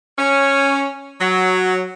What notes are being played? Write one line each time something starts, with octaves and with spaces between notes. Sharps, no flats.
C#4
F#3